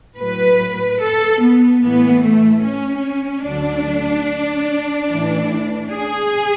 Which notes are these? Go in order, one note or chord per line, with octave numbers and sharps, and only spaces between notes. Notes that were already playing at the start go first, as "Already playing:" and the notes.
A2 F#3 B4
A4
B3
A2 E3 B3
A3
C#4
D2 D3 F#3 D4
A2 E3
G#4